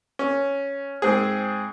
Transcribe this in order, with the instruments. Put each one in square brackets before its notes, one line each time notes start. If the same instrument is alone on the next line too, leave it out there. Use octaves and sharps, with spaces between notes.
[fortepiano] C#4
G#2 C4 G#4